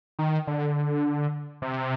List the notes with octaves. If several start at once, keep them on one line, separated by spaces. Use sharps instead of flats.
D#3
D3
C3